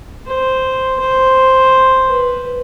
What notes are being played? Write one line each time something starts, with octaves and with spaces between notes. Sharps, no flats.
C5
C5
B4